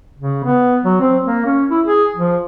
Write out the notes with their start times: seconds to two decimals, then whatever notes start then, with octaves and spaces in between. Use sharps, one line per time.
0.19 C#3
0.44 B3
0.84 F#3
1.01 C4
1.25 A#3
1.45 C#4
1.70 E4
1.85 G#4
2.17 F3